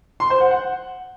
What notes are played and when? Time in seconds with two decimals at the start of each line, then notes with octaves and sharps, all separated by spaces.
0.20 C6
0.30 C5
0.40 F#5
0.51 F#5